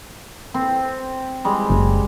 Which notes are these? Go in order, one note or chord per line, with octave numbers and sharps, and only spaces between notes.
C4
G3 G#3
F#1